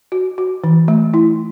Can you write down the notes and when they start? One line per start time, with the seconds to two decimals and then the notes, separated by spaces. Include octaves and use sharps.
0.12 F#4
0.38 F#4
0.64 E3
0.88 A3
1.14 E4